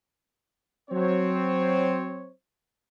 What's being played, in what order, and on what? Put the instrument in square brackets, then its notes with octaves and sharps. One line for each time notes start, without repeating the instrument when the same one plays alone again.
[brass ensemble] F#3 C4 C5 C#5